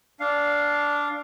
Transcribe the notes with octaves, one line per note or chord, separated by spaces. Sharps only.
D4 F5